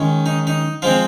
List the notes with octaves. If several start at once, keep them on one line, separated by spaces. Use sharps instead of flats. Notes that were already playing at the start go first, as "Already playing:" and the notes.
Already playing: D#3 G#3 C#4
D#4
D#4
F3 G#3 C4 F4